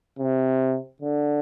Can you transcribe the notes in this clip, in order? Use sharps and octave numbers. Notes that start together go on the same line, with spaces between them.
C3
D3